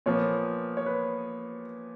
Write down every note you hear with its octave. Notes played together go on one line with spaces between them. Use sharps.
A#2 F3 B3 C#5
C#5
B4